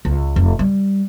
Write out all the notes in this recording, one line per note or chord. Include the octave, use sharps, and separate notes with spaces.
C#2
F1
G3